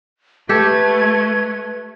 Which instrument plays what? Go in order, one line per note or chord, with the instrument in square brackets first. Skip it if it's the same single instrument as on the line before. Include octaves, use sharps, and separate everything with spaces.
[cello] A3 [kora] G4 A4 [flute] B4 [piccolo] G#6